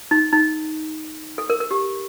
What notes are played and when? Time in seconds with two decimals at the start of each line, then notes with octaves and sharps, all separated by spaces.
0.11 D#4
0.32 D#4
1.38 A4
1.50 A#4
1.60 A#4
1.71 G4